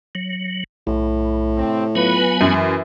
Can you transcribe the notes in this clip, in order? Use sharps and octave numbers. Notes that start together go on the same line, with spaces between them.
F#3
B1 A2
C3 C4
F#3 B3 F4 B4 G#5
F#2 E3